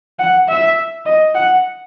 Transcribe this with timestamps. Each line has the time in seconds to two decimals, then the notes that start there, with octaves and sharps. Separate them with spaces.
0.19 F#5
0.48 E5
1.06 D#5
1.35 F#5